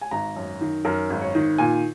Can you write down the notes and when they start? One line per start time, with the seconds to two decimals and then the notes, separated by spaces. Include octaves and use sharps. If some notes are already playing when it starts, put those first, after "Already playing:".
0.01 G#5
0.11 G#1 A#5
0.36 F#2
0.61 D#3
0.85 F#2 A#4
1.10 G#1
1.21 C#5
1.35 D#3
1.58 A#2 G#5